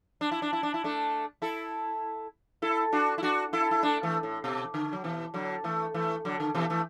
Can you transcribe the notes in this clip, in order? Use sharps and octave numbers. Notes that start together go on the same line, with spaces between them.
D4
E4
D4
E4
D4
E4
A3 D4
E4 A4
E4 A4
D4 F#4
E4
D4 F#4
E4 A4
E4
A3 D4
E3 A3
A2
B2
D3
F#3
B2 E3
D3 F#3
E3 A3
E3 A3
D3 F#3
D3
B2 E3
E3 A3